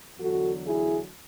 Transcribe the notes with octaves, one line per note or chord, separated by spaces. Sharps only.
E2 D3 F#3 F#4 A4
E4 G#4